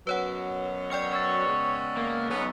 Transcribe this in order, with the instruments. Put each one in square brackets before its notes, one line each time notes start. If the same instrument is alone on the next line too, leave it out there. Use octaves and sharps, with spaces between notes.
[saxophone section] F#2 B2 F#3 [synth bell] B4 C#5 F#5
[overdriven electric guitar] C#5 [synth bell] D5 G5 F6
[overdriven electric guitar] C#5 [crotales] C#6 E6 A6
[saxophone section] C#3 G#3 B3
[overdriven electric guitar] A#3
[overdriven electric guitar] B1 [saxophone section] B3 C#4